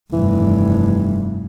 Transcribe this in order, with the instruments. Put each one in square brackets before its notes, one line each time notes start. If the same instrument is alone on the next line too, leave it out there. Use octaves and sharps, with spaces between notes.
[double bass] F1 G2 [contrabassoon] E3